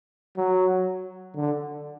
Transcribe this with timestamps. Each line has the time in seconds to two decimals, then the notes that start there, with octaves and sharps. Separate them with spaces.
0.37 F#3
1.36 D3